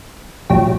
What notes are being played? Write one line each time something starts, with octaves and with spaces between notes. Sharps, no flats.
A#1 A2 F#3 G4